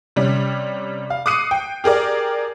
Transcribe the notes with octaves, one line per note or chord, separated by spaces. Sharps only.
C3 G3 C#4
F5
D6 D#6 F#6 C7 C#7 D#7
G5
G4 G#4 A#4 D5